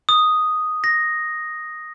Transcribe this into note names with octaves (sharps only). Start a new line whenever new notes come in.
D#6
A#6